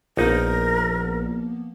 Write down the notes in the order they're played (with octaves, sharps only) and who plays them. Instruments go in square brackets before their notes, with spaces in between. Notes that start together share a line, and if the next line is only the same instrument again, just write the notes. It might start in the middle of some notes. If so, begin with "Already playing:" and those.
[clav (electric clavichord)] A#1 D#4 [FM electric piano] F3 A#3 B3 [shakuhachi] A#4